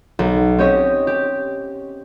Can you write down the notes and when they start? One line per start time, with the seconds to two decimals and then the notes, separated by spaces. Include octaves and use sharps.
0.19 B1
0.58 C4 C#4 G4 C#5 D#5
1.07 G4